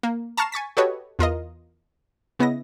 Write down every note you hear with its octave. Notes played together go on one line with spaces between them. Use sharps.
A#3
A5 A#5 C#6 F6 C7 E7
G#5 C#6 A6 B6
F#4 G4 A4 B4 C#5 D#5
E2 F4 A#4 D#5
C#3 B3 E4 D#5 A#6